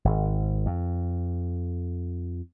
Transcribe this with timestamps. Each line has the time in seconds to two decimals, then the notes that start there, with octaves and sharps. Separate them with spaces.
0.05 G#1
0.66 F2